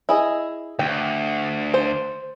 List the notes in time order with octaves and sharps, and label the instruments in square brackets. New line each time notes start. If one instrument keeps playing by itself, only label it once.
[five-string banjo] E4 G#4 D#5
[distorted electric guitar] D2 [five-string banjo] G5
[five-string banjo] C5